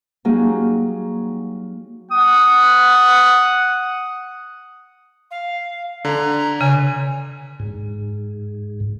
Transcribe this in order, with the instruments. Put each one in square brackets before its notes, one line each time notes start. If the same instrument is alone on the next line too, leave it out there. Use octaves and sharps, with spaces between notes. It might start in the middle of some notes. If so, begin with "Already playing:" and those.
[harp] F#3 G3 A#3 C#4 D#4 G#4
[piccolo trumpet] F#5 [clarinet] D#6
[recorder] F5
[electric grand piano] D3 [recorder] A#5
[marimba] C#3 [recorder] G#5
[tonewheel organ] G#2